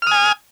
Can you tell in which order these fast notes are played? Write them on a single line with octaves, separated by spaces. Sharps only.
F6 D#6 G#5